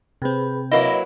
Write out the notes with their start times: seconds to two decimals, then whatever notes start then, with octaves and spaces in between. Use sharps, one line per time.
0.22 C3 C4 G#4 B4 B5
0.72 F#3 A#3 E4 B4 C#5 D#5 C#6